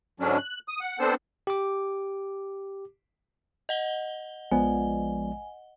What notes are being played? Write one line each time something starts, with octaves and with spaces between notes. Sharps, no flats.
G#2 D3 F#3 C#4 D4
F#6
D#6
F#5
B3 C4 D4 A4 C5
G4 D6
D#5 F#5 G7
A#1 F3 G#3 B3 D5 G#5